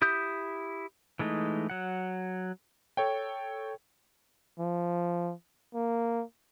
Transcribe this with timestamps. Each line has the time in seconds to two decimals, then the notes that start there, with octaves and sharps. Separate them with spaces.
0.02 E4 G4 D#6 G6
1.19 E3 G#3 A3 D#4
1.70 F#3 F#5
2.97 A4 C#5 G5
4.59 F3
5.75 A#3